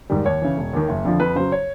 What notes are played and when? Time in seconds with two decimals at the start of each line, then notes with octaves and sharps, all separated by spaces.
0.10 G#2 D#3 G3
0.25 D#2 C#5
0.42 C#3 E3
0.57 E1
0.73 D#2 D#3
0.89 F#1
1.04 F2 D3 F3
1.20 F2 B4
1.36 C#3 F#3 C5
1.52 C#5